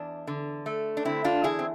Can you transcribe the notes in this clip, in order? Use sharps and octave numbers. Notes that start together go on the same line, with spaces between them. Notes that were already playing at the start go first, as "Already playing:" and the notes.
Already playing: E2 D4
D3
A3
D4
D3 C4 E4
D4 F4
E2 E4 G#4
C4